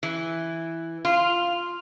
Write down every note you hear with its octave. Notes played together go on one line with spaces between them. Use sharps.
E3
F4